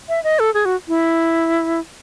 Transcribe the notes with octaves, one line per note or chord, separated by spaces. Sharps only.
E5
D#5
A4
G#4
F#4
E4